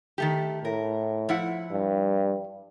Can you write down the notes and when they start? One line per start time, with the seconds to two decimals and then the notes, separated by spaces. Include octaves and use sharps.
0.18 D#3 A3 G4
0.65 A2 A#4
1.29 F3 E4 F#5
1.72 G2